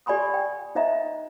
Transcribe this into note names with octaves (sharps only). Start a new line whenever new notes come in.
G4 D5 G#5 B5 C6 D#6
G5
D#4 C5 D#5 E5 A#5